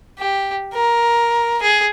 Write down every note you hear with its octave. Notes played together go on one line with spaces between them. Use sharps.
G4
A#4
G#4